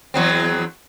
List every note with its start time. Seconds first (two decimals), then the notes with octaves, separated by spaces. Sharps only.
0.14 E2 F#3 C4